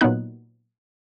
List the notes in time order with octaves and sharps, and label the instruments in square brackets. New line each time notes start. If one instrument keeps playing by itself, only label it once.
[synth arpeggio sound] A#2 F#3 B3 D#4 F#6